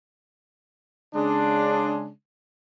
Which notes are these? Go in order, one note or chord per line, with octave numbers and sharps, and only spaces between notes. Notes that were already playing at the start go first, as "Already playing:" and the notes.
C#3 G#3 D4